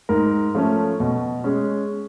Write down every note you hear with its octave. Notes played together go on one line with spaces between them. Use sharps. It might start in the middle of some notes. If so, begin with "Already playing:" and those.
G#2 A#4
F3 A3 C#4
B2
G#3 C#4